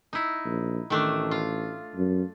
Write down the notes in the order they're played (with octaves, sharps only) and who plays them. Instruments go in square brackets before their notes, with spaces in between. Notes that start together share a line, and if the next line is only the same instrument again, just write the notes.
[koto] D#4 E4
[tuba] A#1
[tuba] A1 [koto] D#3 A3 D4
[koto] F4
[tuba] F#2